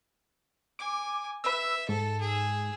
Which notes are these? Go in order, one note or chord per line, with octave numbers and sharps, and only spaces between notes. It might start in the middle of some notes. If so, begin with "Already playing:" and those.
G#5 D6
B4 E5 E6
G#2 A4
G#4 E6